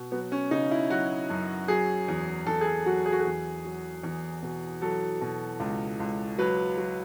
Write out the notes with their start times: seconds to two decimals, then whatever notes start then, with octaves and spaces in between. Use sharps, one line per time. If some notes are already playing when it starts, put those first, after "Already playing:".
Already playing: B2
0.12 F#3 B3
0.32 C#4
0.51 C#3 D#4
0.71 E4
0.90 F#3 F#4
1.30 F#2
1.68 F#3 G#4
2.08 E2
2.46 E2 A4
2.61 G#4
2.67 A4
2.86 F#3 F#4
3.06 G#4
3.12 F#4
3.21 E2 G#4
3.65 F#3
4.03 E2
4.42 B2
4.82 F#3 A4
5.21 B2
5.60 C#2
6.00 C#2
6.38 F#3 B4
6.78 F#3